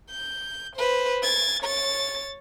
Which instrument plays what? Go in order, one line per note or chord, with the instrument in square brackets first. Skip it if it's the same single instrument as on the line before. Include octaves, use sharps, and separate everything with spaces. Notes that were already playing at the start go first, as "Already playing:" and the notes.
[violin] G6
B4 C5
G#6 A6
C#5 A6